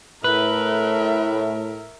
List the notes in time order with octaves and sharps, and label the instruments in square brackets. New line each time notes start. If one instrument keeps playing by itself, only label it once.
[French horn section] A2 [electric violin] A#4 E5 [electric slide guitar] B4